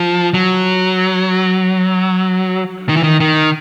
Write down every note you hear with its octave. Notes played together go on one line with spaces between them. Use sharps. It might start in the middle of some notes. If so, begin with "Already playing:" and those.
Already playing: F3
F#3
D#3
E3
D#3
D#3